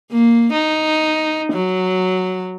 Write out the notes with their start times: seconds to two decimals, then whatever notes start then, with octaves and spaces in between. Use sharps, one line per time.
0.11 A#3
0.53 D#4
1.52 F#3